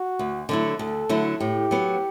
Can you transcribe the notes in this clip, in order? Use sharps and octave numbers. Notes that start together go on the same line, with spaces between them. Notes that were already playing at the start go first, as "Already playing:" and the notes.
Already playing: F#4
D2
D3 F#3 A3 E4
D2 A4
D3 F#3 A3 E4
A2 G4
F#3 B3